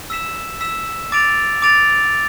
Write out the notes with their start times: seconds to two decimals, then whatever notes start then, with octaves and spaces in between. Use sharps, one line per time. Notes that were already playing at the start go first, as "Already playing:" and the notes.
0.10 E6 B6 E7
0.61 E6 B6 E7
1.12 D6 A6 D7 F7
1.62 D6 A6 D7 F7